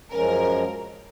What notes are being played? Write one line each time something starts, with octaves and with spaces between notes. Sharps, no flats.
F#2 F3 G#3 C#4 A#4